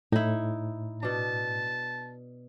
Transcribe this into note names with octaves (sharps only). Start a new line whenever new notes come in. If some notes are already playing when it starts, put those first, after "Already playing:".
A2 D#4 E4
B2 D4 A5